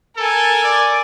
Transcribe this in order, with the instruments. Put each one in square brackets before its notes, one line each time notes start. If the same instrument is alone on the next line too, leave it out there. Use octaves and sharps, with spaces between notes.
[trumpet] A4 [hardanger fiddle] A#4 G#5
[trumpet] D5